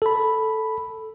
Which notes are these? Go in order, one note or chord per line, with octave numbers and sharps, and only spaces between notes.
A4 B5